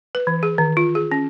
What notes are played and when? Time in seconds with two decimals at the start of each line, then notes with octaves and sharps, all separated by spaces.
0.15 B4
0.27 E3
0.43 G#4
0.58 D#3
0.77 F4
0.95 G#4
1.12 C#4